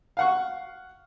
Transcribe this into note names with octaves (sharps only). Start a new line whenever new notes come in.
F5 F#5 C#6